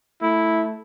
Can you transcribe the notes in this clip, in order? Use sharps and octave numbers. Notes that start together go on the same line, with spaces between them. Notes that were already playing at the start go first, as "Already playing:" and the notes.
A3 E4